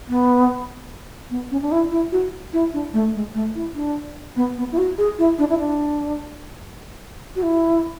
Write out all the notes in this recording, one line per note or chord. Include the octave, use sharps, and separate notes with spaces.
B3
B3
C#4
D4
E4
E4
F#4
E4
D4
A3
G#3
A3
E4
D4
B3
B3
E4
F#4
G#4
E4
D4
E4
D4
F#4
E4